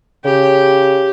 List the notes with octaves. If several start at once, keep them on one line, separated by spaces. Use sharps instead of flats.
C#3 G4